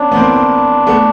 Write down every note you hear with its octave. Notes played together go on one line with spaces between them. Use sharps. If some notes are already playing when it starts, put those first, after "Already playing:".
Already playing: B3 C#4 D4
B3
A#3 C4
A3 B3